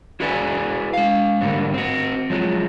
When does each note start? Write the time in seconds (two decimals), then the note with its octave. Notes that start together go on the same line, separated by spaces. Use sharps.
0.20 E4 F#4 G#4 B4 D5 G#5
0.94 G#3 F5
1.41 G#2 D3 G3 A#3
1.74 C4 F#4
2.30 F3 F#3 G#3